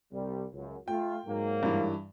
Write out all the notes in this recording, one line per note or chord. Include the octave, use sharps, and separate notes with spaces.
C2 G3
C#2 F#2
A3 F4 G5
G#2 F#3 A#3
G2 E3